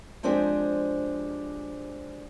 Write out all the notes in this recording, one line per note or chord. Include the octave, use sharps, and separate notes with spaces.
F3 G#3 C4 D4 G4 G#4